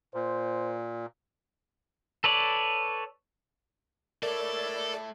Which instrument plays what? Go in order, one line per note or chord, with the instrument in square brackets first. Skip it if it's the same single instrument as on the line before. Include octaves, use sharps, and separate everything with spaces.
[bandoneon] A#2 [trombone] C5
[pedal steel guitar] A4 B4 C#5 D5
[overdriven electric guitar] A3 C#5 [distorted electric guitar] A4 [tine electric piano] A#4 [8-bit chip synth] D5